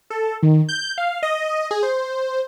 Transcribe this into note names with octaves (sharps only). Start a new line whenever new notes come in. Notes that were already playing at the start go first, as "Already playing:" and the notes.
A4
D#3
G6
F5
D#5
G#4
C5